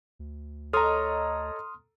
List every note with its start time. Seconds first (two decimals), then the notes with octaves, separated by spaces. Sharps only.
0.19 D2
0.73 A4 C#5 D#5 A#5 C6 D#6 F6